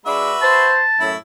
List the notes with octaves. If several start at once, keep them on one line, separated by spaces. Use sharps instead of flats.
G#3 D4 F#4 B4 E5
C5 A5
F#2 A2 E4